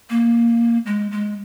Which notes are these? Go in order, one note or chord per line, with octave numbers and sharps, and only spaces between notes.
A#3
G#3
G#3